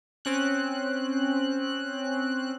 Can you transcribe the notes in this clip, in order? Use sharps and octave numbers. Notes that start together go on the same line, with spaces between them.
C4 C#4 F#6